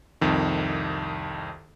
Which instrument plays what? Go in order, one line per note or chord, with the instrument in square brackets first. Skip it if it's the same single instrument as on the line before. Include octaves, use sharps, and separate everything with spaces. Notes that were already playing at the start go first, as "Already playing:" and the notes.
[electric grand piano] C2 F2 D#3